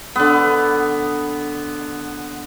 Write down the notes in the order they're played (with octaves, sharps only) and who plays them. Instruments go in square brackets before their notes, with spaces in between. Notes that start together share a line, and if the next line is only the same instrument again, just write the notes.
[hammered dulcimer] D3 B3